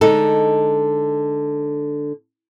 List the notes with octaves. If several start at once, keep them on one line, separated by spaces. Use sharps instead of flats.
D3 G#3 D#4 A4